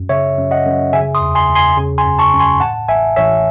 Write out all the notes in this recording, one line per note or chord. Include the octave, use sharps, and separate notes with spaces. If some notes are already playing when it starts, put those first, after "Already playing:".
Already playing: F#2
C#3 C#5 E5
F#2
D#5 F#5
F#2
C#3 E5 G#5
C6 D#6
E2
G#5 C6
E2
G#5 C6
C#3
G#5 C6
F#2
A5 C#6
F#2
G#5 C6
A2 F#5 A5
A1 E5 G#5
A1 C#5 E5